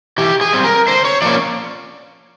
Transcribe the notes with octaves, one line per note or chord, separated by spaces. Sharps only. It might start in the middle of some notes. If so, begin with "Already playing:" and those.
E3 G4
G#4
G3 C4
A#4
D3 C5
C#5
F3 A#3 C#4 D5